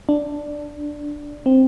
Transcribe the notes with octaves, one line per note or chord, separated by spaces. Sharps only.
D4
C4